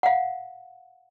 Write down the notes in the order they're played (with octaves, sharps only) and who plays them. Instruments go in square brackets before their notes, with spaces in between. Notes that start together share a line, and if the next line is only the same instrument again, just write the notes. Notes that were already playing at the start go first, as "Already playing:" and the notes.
[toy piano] F5 F#5